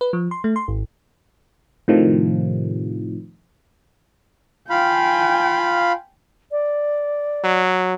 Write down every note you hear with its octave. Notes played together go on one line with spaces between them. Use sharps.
B4
F3
C6
A3
C6
G#1
A2 C3 D#3 F3
F4 F5 G5 G#5 B5
D5
F#3